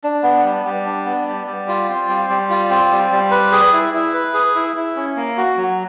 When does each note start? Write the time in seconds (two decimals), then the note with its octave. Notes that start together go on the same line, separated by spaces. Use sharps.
0.04 D4
0.23 B3
0.44 G3
0.65 G3
0.86 D4
1.05 B3
1.27 G3
1.47 G3
1.68 F4
1.89 C4
2.09 G3
2.29 G3
2.50 F4
2.70 C4
2.91 G3
3.12 G3
3.31 B4
3.52 G#4
3.73 E4
3.94 E4
4.14 B4
4.34 G#4
4.55 E4
4.76 E4
4.96 C#4
5.16 A#3
5.37 F#4
5.57 F#3